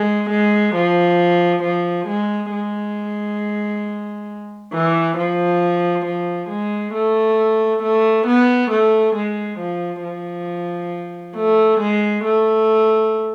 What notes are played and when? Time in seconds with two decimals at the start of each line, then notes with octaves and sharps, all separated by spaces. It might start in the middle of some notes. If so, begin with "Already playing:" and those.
Already playing: G#3
0.30 G#3
0.75 F3
1.63 F3
2.07 G#3
2.52 G#3
4.73 E3
5.17 F3
6.05 F3
6.50 G#3
6.94 A3
7.83 A3
8.27 B3
8.71 A3
9.15 G#3
9.59 F3
10.04 F3
11.36 A3
11.80 G#3
12.24 A3